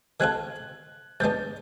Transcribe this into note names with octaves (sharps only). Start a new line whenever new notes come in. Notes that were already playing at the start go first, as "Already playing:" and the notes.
D#3 G#3 C4 F4 A4 F#6 G#6
G#2 D#3 G#3 B3 D4 G6 A6